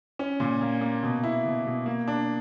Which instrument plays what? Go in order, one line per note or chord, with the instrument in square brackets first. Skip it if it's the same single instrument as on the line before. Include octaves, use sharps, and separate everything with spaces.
[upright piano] C#4
A#2
A#3
A#3
B2
E4
B2
B2
A#3
D4